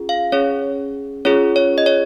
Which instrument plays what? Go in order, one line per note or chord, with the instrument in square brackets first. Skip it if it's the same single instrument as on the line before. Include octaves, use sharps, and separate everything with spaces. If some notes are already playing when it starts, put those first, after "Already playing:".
Already playing: [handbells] C#4 F4 G#4
F5
C#4 G#4 C#5
C#4 F4 G#4 C#5
C#5
D#5
C#5